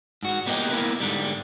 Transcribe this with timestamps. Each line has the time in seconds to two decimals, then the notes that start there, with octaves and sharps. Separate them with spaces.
0.23 G#2 F#4
0.46 G3 A#3 B3 A#4 D#5 G5
0.71 A#3 B3 E4 A#4 B4
1.00 G#2 D3 G3